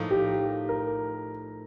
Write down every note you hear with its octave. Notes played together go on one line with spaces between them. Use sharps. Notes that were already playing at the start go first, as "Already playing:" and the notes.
Already playing: A2 F3 A#3 D#4
G4
A#4